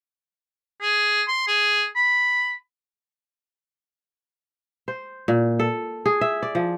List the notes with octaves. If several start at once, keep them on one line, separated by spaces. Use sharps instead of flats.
G#4
C6
G#4
B5
C5
A#2
A4
G#4
E5
D5
F3